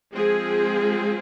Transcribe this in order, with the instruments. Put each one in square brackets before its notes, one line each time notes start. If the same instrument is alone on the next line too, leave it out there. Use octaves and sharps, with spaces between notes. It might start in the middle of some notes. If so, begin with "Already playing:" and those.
[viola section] F3 G#3 C4 G#4